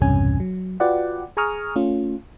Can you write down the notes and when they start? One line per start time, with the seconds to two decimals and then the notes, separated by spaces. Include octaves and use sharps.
0.01 B1 E2 G2 C3 C#4 G#5
0.40 F#3
0.80 F4 F#4 B4 D5 F#5 G5
1.37 G#4 G#5 A#5 C#6 D#6 F6
1.76 A3 C#4 F4